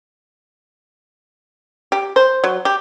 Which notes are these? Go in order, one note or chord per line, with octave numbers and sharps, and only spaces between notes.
G4
C5
F#3
G4